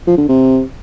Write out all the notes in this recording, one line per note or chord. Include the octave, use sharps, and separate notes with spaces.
F3
D3
C3